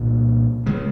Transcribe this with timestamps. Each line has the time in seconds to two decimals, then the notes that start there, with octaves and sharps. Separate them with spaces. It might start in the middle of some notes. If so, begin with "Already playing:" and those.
Already playing: C2 A#2
0.66 C#3 G#3